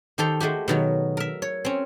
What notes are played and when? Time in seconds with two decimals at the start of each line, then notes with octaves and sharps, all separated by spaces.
0.18 D#3 G4 A4 C5 A#5 C6
0.40 G#3 A3 F#4 G4
0.68 B2 D#3 F#3
1.17 A#4 E5
1.42 C#5
1.65 C4 C#4